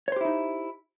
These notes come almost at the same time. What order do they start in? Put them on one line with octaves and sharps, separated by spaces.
C#5 C5 G4 E4 D#4